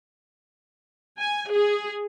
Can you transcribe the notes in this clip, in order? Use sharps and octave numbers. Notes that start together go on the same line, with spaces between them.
G#5
G#4